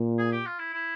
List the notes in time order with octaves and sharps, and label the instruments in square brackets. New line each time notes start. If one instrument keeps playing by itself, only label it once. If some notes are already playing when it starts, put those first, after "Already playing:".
Already playing: [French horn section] A#2
[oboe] G#4
G4
F4
E4
E4